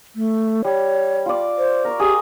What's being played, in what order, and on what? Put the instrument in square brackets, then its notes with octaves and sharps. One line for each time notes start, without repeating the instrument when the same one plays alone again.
[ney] A3
[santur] G3 [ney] C#5
[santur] F4 D5
[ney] C5
[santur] A#4 C#6
[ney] G4 [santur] G#4 G5